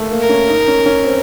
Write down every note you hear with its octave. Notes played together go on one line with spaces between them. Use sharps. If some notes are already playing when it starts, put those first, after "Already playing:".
Already playing: A3 A#3
A#3
A#4
C#4
D#4
C#4
C#4
C4